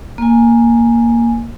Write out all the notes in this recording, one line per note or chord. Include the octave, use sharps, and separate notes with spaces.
A#3 G#5